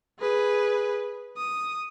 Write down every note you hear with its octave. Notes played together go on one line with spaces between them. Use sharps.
G#4 B4
D#6